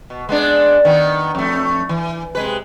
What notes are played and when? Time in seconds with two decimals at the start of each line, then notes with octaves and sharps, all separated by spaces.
0.10 B2
0.29 G#3 B3 D4
0.85 D#3 B3
1.35 F2 A3
1.89 E3
2.35 C3 G#3 B4